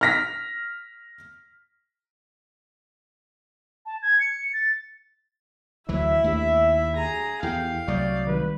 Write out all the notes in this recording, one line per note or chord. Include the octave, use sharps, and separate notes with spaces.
F6 A#6 B6
A5
G#6
C#7
A6
D2 E3 F#3 E4 E5
D#2 A3 D4 G4
G#4 A#5
E2 E4 G4 A4 F5 G5
C2 F#3 A3 D5 C#6 D#6 G6
D#3 G3 B4